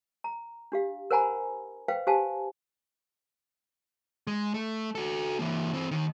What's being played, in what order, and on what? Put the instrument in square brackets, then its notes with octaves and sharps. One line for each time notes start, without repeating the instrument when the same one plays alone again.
[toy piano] A#5
D4 G4 F5
A#4 C5 F#5 G#5 A#5 B5
B4 C5 F5 G5
G4 C5 F5 G#5 A5
[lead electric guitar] G#3
A3
F#4 A4
E3 A#3
E3 C4
D#2 D#3